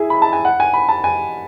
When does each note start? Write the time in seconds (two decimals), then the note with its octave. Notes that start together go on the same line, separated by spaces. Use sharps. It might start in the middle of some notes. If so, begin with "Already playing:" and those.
Already playing: E4 G#4
0.10 B5
0.22 A5
0.33 G#5
0.45 F#5
0.60 G#5
0.73 B5
0.89 A5
1.04 G#5